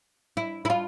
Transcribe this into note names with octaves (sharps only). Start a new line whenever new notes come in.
E4
E4
F4